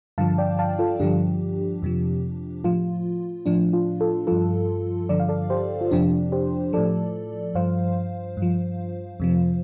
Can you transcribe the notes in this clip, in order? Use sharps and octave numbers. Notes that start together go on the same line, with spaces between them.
G2 D3 F3 F5 A5
D5 G5
F5 A5
F4 A4
G2 D3 F3 D4 G4
F2 C3 F3
A2 F3 F4
A2 F3 D4
F4
F4 A4
G2 F3 F4 A4
G2 D3 F3 D5
F5
A4 D5
G4 C5
F4
F2 C3 F3 D4 G4
G4 C5
A2 F3 A4 D5
G2 F3 C5 F5
G2
F3
F2 C3 F3